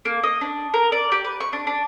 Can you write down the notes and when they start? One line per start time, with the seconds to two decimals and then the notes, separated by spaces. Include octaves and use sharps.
0.05 A#3
0.24 D#5
0.41 D4
0.74 A#4
0.92 D5
1.12 G4
1.24 B4
1.40 C#6
1.53 D4
1.67 D4